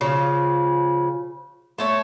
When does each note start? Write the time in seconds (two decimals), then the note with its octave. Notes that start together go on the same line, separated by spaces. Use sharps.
0.01 C#3 F3
1.78 A3 A4 C#5